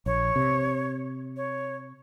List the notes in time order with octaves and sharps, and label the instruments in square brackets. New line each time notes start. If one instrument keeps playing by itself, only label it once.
[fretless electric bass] A#1 [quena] C#5
[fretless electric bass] C3
[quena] C#5